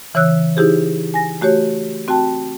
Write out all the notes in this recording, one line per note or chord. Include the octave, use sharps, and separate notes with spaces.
C#3 E3 C#5 E6 F#6
D#4 E4 G4 G#4 C5
G#5 A#6
A3 F#4 G4 C#5
C4 F#4 G5 A5